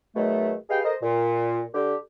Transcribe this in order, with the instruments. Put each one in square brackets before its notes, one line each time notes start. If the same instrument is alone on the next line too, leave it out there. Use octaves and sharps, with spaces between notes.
[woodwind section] E2 B2 D#3 F#3 A3
G4 G#4 B4 D#5 F5 G5
A4 A#4 C5 D#5
A#2
D3 G4